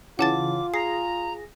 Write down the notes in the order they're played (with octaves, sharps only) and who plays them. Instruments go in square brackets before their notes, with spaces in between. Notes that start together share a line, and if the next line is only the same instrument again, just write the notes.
[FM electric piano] C#3 E3 C#4 [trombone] F4 [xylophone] F#5 A5 A6 [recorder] D6
[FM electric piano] G#4 A#6 [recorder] A#5 [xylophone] C7